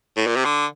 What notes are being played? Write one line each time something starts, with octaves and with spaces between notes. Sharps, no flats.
A2
A#2
C3
D3